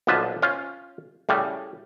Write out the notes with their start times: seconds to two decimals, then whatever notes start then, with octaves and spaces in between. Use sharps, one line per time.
0.07 B1 A#2 D3 F3 B4 A5
0.42 C#4 F4 C5
1.29 A2 C#3 G3